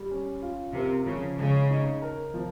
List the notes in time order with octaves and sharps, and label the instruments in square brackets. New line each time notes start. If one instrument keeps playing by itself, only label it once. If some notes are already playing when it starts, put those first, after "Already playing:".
Already playing: [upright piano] G3
C#4
F4
[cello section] C3 [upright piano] A#4
[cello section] C#3 [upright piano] F3
[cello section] C#3 [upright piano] G#3
[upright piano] D#4
A#4
F3